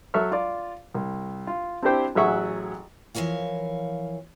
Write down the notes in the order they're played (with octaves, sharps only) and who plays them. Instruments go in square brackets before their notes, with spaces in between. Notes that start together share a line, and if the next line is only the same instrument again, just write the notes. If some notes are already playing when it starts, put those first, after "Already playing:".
[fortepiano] F#3 A4 E5 C#6 F6
F4 D5
C2
F4
C4 D4 E4 G4 C5 G5
A1 F#3 G#4 E5 F#5 C#6
[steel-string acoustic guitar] E3 F3 A#4 C#5 F5